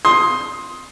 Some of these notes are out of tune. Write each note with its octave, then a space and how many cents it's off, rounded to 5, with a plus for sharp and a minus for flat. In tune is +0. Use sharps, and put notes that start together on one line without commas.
C6 +10 D#6 +15